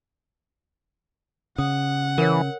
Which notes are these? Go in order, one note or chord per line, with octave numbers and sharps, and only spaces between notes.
C#3 F#5 D#6
E3 A#4 C#5